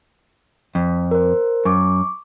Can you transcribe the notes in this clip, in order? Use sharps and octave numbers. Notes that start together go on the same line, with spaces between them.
F2
A#4 C5
F#2 C#6 D6